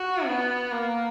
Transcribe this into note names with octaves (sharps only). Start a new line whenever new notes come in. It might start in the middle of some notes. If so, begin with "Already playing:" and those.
Already playing: F#4
B3
A#3